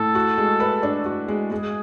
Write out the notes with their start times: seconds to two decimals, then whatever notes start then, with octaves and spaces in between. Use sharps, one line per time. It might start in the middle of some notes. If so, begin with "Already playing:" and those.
Already playing: A2 A4
0.15 F#4
0.38 G#3
0.60 B4
0.83 D4
1.06 F#4
1.28 G#3
1.51 G#3 G#4